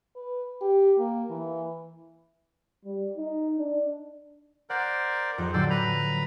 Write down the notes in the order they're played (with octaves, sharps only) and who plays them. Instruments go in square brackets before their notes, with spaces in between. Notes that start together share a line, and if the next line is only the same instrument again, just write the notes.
[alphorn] B4
G4
A#3
E3
[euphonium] G3
D#4
D4
[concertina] A#4 C5 D5 [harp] F#5
[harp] F2 G#4 [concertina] D#4
[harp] A2 D3 F#3 [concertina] A4 C5 D5
[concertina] B4 A#5 B5